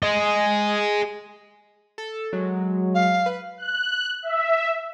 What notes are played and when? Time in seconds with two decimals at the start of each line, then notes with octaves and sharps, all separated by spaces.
0.03 G#4 D#5
1.98 A4
2.33 F#3 G#3
2.94 F5
3.26 B4
3.58 F#6
4.23 E5